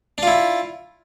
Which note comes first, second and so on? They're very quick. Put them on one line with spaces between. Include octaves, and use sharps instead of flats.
D4 F4 E4